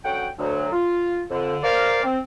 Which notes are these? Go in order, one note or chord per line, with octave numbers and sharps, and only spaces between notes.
D2 F#3 C#4 F#5 G5
D2 F#3
F4
F2 D3
A#4 C5 D5 F5
C4